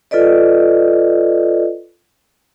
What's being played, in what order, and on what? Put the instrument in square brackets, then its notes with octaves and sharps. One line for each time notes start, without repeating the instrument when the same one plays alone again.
[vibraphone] F4 A4 B4 D5 D#5